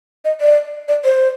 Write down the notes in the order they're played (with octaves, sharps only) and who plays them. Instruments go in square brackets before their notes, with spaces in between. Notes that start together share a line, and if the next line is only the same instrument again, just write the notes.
[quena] D#5
D5
D5
C5